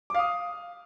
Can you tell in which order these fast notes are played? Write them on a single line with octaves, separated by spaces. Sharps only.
D6 F5 D#6